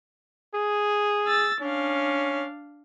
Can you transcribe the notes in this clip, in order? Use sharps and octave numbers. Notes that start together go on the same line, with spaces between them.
G#4
E6 A6
C#4 D4 F5